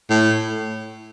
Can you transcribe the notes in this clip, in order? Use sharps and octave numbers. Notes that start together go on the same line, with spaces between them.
A2